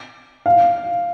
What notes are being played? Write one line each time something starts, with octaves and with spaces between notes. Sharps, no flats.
F5